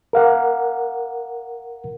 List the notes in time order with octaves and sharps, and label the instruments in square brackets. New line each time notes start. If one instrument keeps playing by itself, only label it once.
[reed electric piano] A#4 F5 F#5